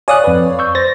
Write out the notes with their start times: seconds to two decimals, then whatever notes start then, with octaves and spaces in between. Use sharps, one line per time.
0.08 C#5 D5 F5 G#5 D#6 F#6
0.24 F2 B4
0.59 C#6 E6 G6
0.75 C5 A6 A#6